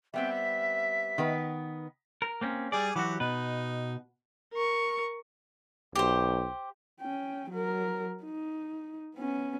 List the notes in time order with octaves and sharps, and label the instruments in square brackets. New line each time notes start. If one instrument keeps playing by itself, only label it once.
[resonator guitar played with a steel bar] G3 B3 C4 [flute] E5 [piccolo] G5
[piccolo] B6
[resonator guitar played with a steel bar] D#3 B3 B4
[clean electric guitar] A#4
A#3 C4 C#4
[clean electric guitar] G3 D5 [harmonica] G#4 G#5 D6
[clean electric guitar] E3 F#3 F#4 [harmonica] G4 F#5 D6
[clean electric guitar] B2 B4 [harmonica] D#4
[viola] A#4 C#6
[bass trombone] B1 [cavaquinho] G4 C5
[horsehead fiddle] C#4 G5
F#3 A#4
D#4
B3 C#4